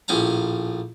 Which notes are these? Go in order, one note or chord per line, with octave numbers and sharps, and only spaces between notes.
A#1 A2 C#4 F5 A#5